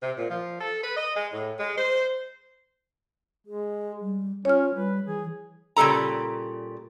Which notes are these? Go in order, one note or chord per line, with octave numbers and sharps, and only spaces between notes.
C3
A#2
F3
A4
B4
D#5
G#3
A2
G#3
C5
G#3 G#4
G3
C#4 F4 C#5 F6
G3 B4
E3 G#4
A#2 C#3 G3 A4 A#5